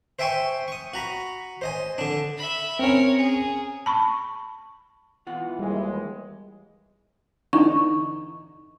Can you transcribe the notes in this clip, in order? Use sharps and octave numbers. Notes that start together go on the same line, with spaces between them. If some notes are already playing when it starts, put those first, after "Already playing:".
C5 E5 G5 G#5 C6 C#6
C#6 D#6
F#4 A#5 B5
C5 D#5 G#5
D3 D4
E5 B5
C4 C#4 A#4 C#5
G#4
A5 B5 C#6
E3 B3 F4 F#5
D#2 G3 G#3
D3 E3 D#4 C#6